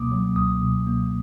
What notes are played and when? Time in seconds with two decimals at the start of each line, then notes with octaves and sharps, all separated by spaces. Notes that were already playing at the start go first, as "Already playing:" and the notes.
Already playing: C#2 B2 F#3 A#3 D6 D#6
0.12 F#3
0.36 C#2 D#6
0.61 B2
0.87 A#3